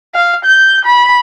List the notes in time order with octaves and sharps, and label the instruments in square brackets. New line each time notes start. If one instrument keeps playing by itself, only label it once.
[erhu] F5
G6
B5